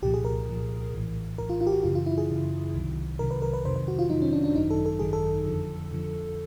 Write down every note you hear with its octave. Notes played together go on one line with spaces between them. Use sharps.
C2 A#2 F3 G4
G#4
A#4
C2 A#2 F3
A#1 A2 E3
A#1 A2 E3 A#4
F4
F4
G4
F#4
F#2 C#3 E3 F4
F4
E4
G#4
F#2 C#3 E3
C2 C3 D#3 F#3
C2 C3 D#3 F#3 A#4
B4
A#4
B4
F2 C3 D#3 F#3 C5
C5
F#4
F4
F2 C3 D#3 F#3 D#4
C#4
D4
D4
G#1 F#2 D#3 F#3 D#4
A4
A4
G#1 F#2 D#3 F#3 G#4
A4
F2 D3 F3
F2 D3 F3